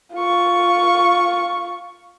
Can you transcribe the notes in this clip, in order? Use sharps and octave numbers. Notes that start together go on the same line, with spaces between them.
F4 C#6